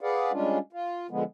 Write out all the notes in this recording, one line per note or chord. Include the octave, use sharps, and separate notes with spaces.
G#4 B4 D5 F5 F#5
G3 G#3 C#4 D4 F4
F4
D3 F3 G#3 B3